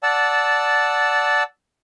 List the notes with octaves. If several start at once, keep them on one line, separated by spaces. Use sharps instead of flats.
D5 F#5 A5 E6